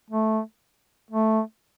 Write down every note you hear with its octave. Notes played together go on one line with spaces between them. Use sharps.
A3
A3